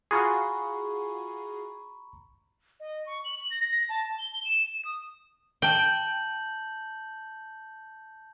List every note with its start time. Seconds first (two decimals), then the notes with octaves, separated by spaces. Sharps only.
0.11 F4 F#4 G#4 A#5 B5 C#6
2.80 D#5
3.06 C#6
3.25 F#7
3.51 A#6
3.71 A#6
3.89 A5
4.19 G7
4.45 E7
4.85 D#6
5.62 G5 A5 G6 F#7